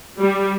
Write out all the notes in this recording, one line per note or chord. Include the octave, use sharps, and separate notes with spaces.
G3